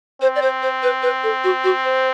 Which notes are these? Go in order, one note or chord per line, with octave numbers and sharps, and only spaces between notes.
C4 C5
D5
C5
C5
B4
B4
A4
F#4
F#4
C5